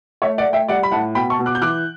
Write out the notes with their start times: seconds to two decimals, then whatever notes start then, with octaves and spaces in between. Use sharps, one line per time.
0.22 A3 C#5 E5
0.38 D5 F#5
0.45 A3
0.53 E5 G5
0.68 G3 D5 F#5
0.83 B5
0.91 A2 F#5 A5
1.15 B2 G5 B5
1.30 A5 C#6
1.39 B2
1.46 D6 F#6
1.55 G6
1.62 E3 D6 F#6